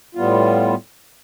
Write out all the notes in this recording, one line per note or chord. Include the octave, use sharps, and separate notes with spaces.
A2 G3 B3 F4